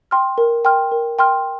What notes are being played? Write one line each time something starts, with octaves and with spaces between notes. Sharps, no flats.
G5 C6 F6
A#4
G5 C6 F6
A#4
G5 C6 F6